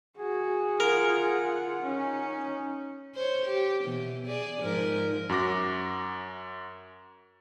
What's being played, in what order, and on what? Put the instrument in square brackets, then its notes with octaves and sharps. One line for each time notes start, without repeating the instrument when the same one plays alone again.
[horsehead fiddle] F#4 [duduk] G#4
[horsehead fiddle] F4 F#5 [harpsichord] A#4
[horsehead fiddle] C#4 [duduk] D#4
[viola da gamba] C5 C#5
G4
B2 E3
G#4 D5
G#2 F3 A#4
[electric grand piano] F#2 F#4 D6 A#6